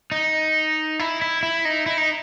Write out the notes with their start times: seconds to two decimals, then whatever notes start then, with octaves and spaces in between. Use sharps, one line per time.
0.12 D#4
0.99 E4
1.22 E4
1.43 E4
1.65 D#4
1.86 E4
1.98 D#4